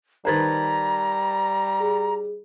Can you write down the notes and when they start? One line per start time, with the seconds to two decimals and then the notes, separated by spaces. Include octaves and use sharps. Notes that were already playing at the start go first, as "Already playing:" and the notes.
0.25 D#3 G3 B4 C5 A5 A#5 G#6 A6
1.80 G#4